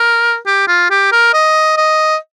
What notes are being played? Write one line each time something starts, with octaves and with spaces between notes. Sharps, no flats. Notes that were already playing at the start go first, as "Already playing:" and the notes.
Already playing: A#4
G4
F4
G4
A#4
D#5
D#5